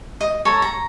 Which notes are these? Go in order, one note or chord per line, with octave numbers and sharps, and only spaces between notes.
D#5
A4 C#5 A#5
A#5